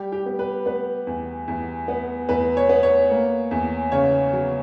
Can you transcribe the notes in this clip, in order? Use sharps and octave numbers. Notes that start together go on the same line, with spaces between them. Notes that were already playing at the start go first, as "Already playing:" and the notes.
Already playing: G3 G4
G4
B3
B4
B3 B4
E2
E2
B3
E2 B4
C#5
B3
C#5
A#3
E2
C#3 C#5
F#3